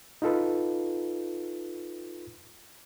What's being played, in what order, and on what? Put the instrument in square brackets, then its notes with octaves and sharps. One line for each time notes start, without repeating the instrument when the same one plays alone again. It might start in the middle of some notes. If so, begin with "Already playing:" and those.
[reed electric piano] D#4 F4 A4 B4